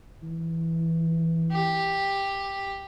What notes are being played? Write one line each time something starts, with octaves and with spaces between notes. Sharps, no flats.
E3
G4